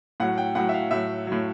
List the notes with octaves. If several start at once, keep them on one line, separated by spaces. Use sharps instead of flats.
A2 F#3 F#5
G5
A2 F#3 F#5
E5
F5
A2 F#3 E5
A2 F#3